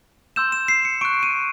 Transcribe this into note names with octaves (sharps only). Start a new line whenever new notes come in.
C6 E6 G6 E7
E7
C7
C#7
C#6 F#6 D7
D#7